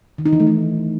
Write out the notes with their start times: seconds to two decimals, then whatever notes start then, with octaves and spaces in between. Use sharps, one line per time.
0.18 D#3
0.26 D#4
0.33 E3
0.40 A3
0.47 D#4